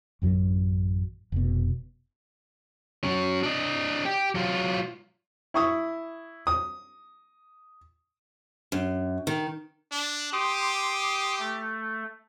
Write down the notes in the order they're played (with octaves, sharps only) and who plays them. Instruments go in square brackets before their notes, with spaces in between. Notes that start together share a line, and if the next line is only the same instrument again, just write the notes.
[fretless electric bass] A1 F#2 F#3
F1 B2
[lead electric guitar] F#3 C#4
D4 D#5
G4
F#3 F4
[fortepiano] E4 C#6 D#6
D#6
[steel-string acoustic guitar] F#2
D#3
[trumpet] D4
[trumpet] G4 [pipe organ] C6 D6 D#6
[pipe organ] A3